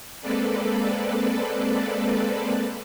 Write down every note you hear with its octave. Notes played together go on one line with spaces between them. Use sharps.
G#3 A#3 C4 A4 B4 D5